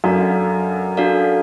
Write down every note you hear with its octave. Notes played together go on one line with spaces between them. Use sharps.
F#2 D4 F#4 A4 D5 F5
D4 F#4 A4 D5 F5